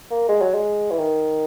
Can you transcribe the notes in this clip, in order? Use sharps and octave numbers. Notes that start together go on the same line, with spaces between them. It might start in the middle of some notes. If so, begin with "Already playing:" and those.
A#3
G#3
F#3
G#3
E3
D#3